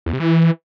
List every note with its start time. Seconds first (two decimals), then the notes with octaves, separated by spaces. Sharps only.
0.06 E2
0.13 C3
0.20 E3